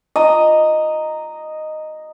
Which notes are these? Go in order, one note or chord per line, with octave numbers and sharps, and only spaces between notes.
D#5 A#5